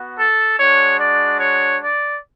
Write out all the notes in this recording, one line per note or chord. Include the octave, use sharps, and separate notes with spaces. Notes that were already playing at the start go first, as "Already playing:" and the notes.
Already playing: B3 F#4
A4
G#3 D4 F#4 C#5
D5
C#5
D5